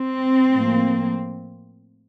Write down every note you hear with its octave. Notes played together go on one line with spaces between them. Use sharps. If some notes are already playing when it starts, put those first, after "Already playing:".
Already playing: C4
A2 F3 A#3